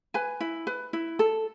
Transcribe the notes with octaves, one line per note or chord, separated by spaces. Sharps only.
B4 G#5
E4
B4
E4
A4